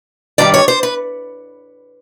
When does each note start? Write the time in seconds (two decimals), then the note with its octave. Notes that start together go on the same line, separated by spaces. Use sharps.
0.38 G2 D#3 G3 D5
0.54 C#5
0.68 C5
0.83 B4